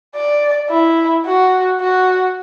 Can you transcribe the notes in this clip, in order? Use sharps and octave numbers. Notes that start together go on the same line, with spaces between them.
D5
E4
F#4
F#4